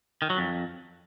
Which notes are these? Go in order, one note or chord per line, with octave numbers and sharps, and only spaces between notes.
D#3
F#3
F2